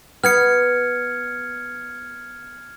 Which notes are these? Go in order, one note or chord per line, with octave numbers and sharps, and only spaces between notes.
B3 F6 G#6 C#7